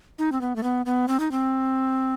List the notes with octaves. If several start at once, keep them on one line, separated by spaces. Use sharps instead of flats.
D#4
C4
B3
A3
B3
B3
C4
D#4
C4